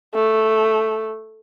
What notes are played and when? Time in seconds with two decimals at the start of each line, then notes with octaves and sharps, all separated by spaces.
0.15 A3